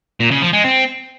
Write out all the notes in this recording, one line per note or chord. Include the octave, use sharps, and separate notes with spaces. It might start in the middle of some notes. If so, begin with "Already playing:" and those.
A#2
C#3
F3
G#3
C4